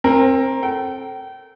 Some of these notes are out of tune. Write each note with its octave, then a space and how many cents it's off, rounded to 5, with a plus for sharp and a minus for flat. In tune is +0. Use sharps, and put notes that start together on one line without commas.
C4 +25 A#4 +0
A4 +0 G5 -35